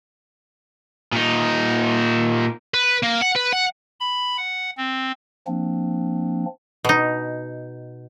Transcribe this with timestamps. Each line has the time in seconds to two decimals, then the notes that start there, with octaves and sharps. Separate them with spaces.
1.12 A#2 D#4
2.74 B4
3.03 A#3
3.21 F#5
3.36 B4
3.52 F#5
4.00 B5
4.38 F#5
4.77 C4
5.47 F3 A#3 C4 D4
6.85 B2 D#4